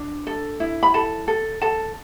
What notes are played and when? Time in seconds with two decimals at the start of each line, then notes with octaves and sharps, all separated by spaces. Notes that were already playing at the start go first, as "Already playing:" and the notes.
Already playing: D4
0.27 A4
0.60 E4
0.83 B5
0.94 A4 A5
1.28 A4
1.61 A4 A5